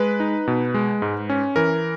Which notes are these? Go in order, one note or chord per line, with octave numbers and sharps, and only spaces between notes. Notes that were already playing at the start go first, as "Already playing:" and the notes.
Already playing: G#3 B4
D#4
B2
G#3
G#2
C#4
E3 A#4